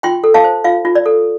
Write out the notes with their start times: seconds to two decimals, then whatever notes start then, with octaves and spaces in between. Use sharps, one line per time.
0.03 F4 G5 C6
0.24 A4
0.34 F5 A5
0.44 C5
0.64 F4 F5
0.85 F4
0.95 D5
1.06 A4